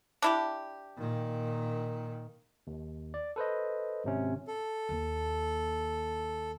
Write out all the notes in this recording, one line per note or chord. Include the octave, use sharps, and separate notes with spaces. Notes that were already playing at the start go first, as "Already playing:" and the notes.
D4 E4 G4
A#2 D#3
D#2
D5
A4 B4 C5 D#5
G#1 C3 C#4
A4
D#2 A#3